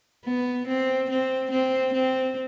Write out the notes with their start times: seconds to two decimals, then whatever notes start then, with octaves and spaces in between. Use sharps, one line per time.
0.25 B3
0.67 C4
1.10 C4
1.51 C4
1.93 C4